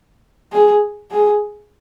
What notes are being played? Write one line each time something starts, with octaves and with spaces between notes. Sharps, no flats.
G#4
G#4